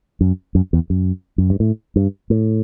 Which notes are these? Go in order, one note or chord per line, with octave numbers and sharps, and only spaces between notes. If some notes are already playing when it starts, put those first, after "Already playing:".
F#2
F#2
E2
F#2
F#2
G2
A2
G2
A2